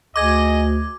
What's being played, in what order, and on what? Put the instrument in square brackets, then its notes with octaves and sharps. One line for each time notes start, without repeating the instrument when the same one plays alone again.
[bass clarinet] D2 [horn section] G#4 D#5 [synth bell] D6 G#6